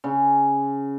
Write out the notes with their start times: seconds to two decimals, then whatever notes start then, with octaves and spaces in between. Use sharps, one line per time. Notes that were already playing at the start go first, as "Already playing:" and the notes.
0.04 C#3